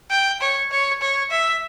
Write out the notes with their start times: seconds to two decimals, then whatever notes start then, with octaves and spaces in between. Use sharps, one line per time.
0.10 G5
0.41 C#5
0.71 C#5
1.01 C#5
1.31 E5